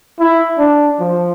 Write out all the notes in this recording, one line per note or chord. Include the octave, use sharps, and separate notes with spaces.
E4
D4
F3